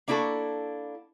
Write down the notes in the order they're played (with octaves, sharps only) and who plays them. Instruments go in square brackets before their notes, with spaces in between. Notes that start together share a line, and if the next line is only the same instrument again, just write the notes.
[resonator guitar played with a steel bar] A#3 D4 E4 F#4 A4